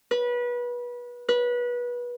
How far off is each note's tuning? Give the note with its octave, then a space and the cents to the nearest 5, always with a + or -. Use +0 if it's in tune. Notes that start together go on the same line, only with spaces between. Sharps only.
B4 -25
B4 -25